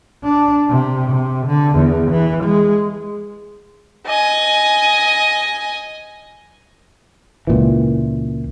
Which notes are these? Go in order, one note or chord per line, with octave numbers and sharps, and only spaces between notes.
D4
C3
C3
D3
E2
E3
G#3
D#5 G#5
C#2 A#2 E3